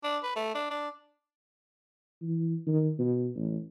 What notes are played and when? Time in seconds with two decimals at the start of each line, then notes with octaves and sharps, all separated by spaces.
0.03 D4
0.23 B4
0.36 A3
0.55 D4
0.70 D4
2.21 E3
2.67 D#3
2.99 B2
3.36 A1